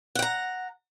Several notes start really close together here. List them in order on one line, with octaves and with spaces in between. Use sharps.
F#5 G5 A#5